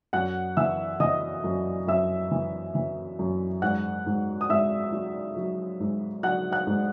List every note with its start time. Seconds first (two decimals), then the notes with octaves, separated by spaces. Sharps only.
0.13 F#2 F#5 F#6
0.57 E3 E5 E6
1.00 E3 D#5 D#6
1.44 F#2
1.87 F#2 E5 E6
2.31 E3
2.75 E3
3.19 F#2
3.62 G#2 F#5 F#6
4.06 G#2
4.41 D#6
4.49 G#2 E5 E6
4.92 F#3
5.37 F#3
5.80 G#2
6.23 F#3 F#5 F#6
6.52 F#5 F#6
6.67 G#2